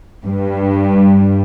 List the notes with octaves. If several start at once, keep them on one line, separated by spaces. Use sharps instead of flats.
G2